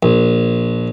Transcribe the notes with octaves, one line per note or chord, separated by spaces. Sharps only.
A#1